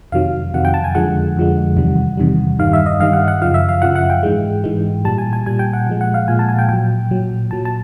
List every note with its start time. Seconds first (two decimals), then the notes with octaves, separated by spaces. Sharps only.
0.12 F2 C3 D#3 F#3 F5
0.54 F2 C3 D#3 F#3 F#5
0.65 G5
0.74 A5
0.84 G#5
0.95 F2 D3 F3 G#3 F#5
1.36 F2 D3 F3 G#3
1.76 E2 C3 D#3 G3
2.17 E2 C3 D#3 G3
2.59 G2 D#3 G3 F5
2.73 E5
2.86 D#5
3.00 G2 D#3 G3 F5
3.13 F#5
3.28 F#5
3.42 F#2 C#3 F3 F5
3.54 E5
3.69 F5
3.82 F#2 C#3 F3 F#5
3.96 F#5
4.10 G5
4.23 G#2 E3 G#3
4.64 G#2 E3 G#3
5.05 A#2 G3 A5
5.18 G#5
5.33 G#5
5.46 A#2 G3 G#5
5.59 G5
5.73 F#5
5.87 A#2 F3 G#3
6.01 F#5
6.14 F5
6.28 A#2 F3 G#3 G#5
6.39 A5
6.49 G#5
6.59 G5
6.69 A#2 F#3 G5
7.11 A#2 F#3
7.51 A#2 F#3 A5
7.65 A5